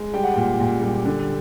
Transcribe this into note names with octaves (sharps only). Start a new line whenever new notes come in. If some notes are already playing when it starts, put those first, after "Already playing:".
Already playing: G#3
G3 G5
F#5
A#2 G5
A#2
G3
D3